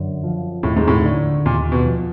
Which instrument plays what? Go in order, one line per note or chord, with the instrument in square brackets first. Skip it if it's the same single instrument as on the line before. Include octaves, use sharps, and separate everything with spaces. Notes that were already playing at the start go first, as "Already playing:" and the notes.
Already playing: [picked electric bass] F#2 D3
F3
[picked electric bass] D#2 [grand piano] A2
[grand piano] G#2
A2
[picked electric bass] D3
[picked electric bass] D#2 [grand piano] A#2
[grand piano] B2
[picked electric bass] F3